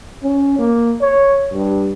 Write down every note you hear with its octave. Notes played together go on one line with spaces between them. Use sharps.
C#4
A#3
C#5
G2